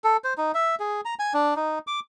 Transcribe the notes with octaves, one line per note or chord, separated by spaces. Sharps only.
A4
C5
D#4
E5
G#4
A#5
G#5
D4
D#4
D6